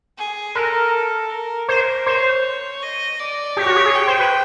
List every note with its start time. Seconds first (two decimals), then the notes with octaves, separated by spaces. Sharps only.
0.18 G#4
0.55 A4 A#4
1.31 A#4
1.68 A#4 C5
2.06 C5 C#5
2.82 D#5
3.20 D5
3.57 G4 C#5
3.66 F#4
3.76 G4
3.85 G#4
3.95 G5
4.07 C5
4.19 B4